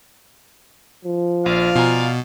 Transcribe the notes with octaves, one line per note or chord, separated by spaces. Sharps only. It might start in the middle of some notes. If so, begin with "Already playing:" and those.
F3
A#1 D5 F5
B2 F4 G#5 A#5